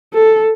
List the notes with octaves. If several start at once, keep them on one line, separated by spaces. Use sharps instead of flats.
A4